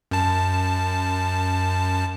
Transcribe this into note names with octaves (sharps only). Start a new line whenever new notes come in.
F#2 A5